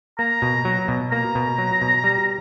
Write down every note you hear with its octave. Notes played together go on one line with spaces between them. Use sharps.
A#3 A#5
B2
F#3
B2
A#3 A#5
B2
F#3
B2
G3